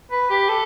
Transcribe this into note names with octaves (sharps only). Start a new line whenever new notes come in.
B4
G4
A4